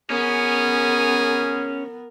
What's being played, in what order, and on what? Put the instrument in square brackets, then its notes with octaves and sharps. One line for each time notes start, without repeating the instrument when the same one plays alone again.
[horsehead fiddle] B3 A#4 [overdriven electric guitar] C#4 [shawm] G#4